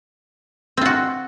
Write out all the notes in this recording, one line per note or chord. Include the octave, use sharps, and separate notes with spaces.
C4 F4 F#4